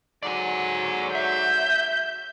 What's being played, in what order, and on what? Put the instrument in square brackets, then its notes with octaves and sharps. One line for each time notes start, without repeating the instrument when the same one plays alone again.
[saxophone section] G#2 D3 F#3 [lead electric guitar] D5 G#5
[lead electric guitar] E5 [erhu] G6